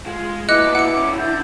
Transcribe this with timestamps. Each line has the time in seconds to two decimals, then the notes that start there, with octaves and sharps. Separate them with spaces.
0.06 G#3 F4
0.49 A#2 B3 E4 D#5 D6 F#6 C#7
0.75 E4 F#5 C#7
0.94 E2 C#4 D6
1.18 D3 E4 G6